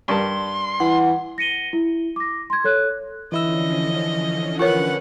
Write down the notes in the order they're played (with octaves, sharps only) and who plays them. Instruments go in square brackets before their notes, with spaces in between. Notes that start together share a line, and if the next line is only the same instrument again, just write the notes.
[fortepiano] G2 A#4 A5 [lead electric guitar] C6
[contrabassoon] E3 [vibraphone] F#5
[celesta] A#6 C#7 D#7 G7
E4
D6 A#6
C6 G#6
A4 C#5 F#6
[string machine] D3 F3 C#4 [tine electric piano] E3 E4 E6 [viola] D#5
[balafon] F4 A#4 C#5 [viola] B4 F#5